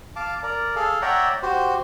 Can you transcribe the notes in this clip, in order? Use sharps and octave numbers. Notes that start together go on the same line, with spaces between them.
F5 A5 D6
A#4 D5
G#4 A4 F5
C#5 D5 E5 F#5 G5 A#5
F#4 G4 C5